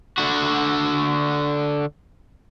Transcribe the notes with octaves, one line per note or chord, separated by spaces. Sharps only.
D3 F#4